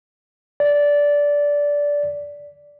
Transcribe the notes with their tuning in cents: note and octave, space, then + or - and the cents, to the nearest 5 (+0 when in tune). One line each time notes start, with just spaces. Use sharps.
D5 -15